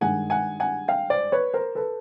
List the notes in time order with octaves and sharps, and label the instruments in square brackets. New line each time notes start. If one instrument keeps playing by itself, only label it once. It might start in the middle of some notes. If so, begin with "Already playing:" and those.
[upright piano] G2 D#3 G#3 F#5 G#5
F#5 G#5
F#5 G#5
F5 G5
C5 D5
B4 C#5
A#4 C5
A4 B4